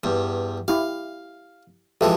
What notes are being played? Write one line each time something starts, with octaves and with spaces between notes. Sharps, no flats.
E2 G2
E4 G4 F5
F2 E3 G#3 G4 A4 E5